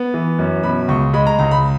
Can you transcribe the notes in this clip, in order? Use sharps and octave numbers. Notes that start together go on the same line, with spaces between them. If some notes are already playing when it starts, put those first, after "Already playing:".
Already playing: B3
E3
F#2
B2 B5
C#2 C#6
G#3 B5
A#5
C#2 A#5
B5